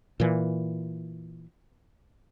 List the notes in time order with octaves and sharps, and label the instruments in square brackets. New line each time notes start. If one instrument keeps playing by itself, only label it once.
[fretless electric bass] A#2 E3